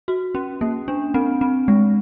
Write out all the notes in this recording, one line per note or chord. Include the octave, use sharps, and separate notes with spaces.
F#4
C#4
A#3
D4
C4
C4
G#3